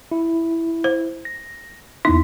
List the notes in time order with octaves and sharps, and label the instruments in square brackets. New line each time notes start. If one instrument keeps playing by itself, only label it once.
[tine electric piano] E4
[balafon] C5
[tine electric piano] A#6
[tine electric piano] E2 B3 E4 [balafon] D#4